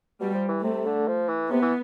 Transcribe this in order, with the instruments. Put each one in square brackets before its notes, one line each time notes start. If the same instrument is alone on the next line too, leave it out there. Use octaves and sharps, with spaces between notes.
[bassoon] B2 [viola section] G3
[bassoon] F3
E3
[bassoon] C3 [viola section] A3
[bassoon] D3
F3
E3
[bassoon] C3 [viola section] B3
[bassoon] E3